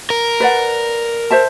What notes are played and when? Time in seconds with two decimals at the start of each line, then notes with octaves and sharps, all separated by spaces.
0.10 A#4
0.40 B4 D5 F#5
1.31 C5 E5 A5